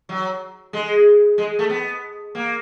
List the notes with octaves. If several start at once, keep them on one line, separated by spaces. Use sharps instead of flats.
F#3
G#3
G#3
A3
B3
A#3